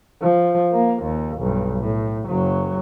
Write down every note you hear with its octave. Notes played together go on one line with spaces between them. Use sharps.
F3
A#3
D#2
B1 G2
A2
F#1 F#3